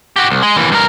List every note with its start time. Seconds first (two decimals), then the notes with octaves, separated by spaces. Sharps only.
0.16 F#4 G4
0.30 C2
0.42 G#3
0.56 D#2 E3
0.72 G2 A#4